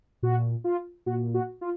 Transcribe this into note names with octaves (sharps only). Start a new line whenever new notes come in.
A#2 F#4
F4
A#2 F#4
F#4
F4